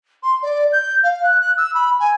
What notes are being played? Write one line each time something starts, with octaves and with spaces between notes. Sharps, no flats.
C6
D5
G6
F5
F#6
F#6
E6
B5
G#5